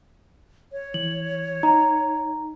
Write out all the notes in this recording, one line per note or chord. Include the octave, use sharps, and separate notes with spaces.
C#5
E3 F#7
D#4 A#5